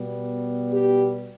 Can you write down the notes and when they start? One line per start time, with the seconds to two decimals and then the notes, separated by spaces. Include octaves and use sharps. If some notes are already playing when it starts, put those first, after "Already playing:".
Already playing: B2 G3 B3
0.74 G4